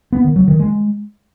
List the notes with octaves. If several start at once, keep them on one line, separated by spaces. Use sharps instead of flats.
B3
D#3
F#3
D#3
G#3